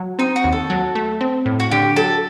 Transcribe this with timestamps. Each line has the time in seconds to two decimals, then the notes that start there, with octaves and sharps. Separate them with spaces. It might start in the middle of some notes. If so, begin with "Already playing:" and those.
Already playing: F#3
0.19 C4 D#4
0.36 F#4
0.44 D#2
0.52 A4
0.70 F#3
0.95 A3
1.21 C4
1.46 A2
1.60 F#4
1.71 D3 G4
1.96 F#3 A4